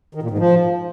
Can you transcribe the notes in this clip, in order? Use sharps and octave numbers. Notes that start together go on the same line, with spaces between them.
D#3
A#2
G#2
F3